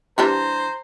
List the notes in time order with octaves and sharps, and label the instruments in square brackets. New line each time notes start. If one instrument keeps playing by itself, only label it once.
[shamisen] E3 G3 D4 [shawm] C5 [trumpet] A#5